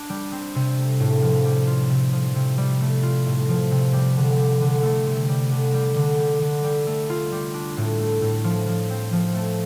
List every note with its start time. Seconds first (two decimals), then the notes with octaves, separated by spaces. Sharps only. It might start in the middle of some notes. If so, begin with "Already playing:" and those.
Already playing: D4
0.09 G3
0.32 C4
0.55 C3
0.78 A3
1.00 A2
1.22 F3
1.45 G3
1.67 F4
1.90 C3
2.12 F3
2.36 C3
2.58 G3
2.81 A3
3.03 F4
3.25 A2
3.49 F3
3.71 C3
3.93 G3
4.16 D3
4.39 G3
4.61 D3
4.83 A3
5.06 C3
5.29 G3
5.51 D3
5.74 G3
5.96 D3
6.18 G3
6.41 D3
6.64 G3
6.87 A3
7.10 F4
7.32 G3
7.54 D4
7.77 A2
7.99 A3
8.22 A2
8.44 F3
8.67 F3
8.90 C4
9.12 F3
9.34 A3